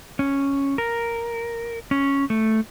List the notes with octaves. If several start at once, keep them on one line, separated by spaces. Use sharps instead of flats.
C#4
A#4
C#4
A3